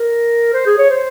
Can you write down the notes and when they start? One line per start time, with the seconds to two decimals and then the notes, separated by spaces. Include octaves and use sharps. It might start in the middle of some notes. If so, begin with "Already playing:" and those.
Already playing: A#4
0.53 C5
0.66 G#4
0.78 C#5
0.90 C5